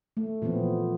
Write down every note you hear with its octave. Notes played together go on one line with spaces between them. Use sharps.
A3
A#2 E3 F3 B3 C4